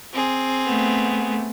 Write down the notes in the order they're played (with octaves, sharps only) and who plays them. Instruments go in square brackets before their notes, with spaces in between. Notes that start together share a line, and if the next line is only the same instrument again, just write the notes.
[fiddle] C4 G#4
[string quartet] A3 B3